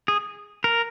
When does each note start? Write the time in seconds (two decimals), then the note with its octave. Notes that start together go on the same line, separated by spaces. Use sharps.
0.08 G#4
0.64 A#4